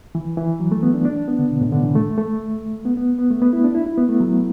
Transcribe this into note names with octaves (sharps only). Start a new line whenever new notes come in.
E3
E3
F#3
A3
B3
D4
D4
D4
B3
D3
B2
A2
D3
E3
A3
A3
B3
B3
B3
A3
B3
E4
D4
E4
E4
B3
A3
F#3